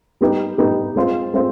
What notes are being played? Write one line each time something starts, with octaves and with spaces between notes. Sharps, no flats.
G3 B3 D#4 G4
G3 B3 D#4 G4
G#3 C4 F4 C5
G#3 C4 F4 C5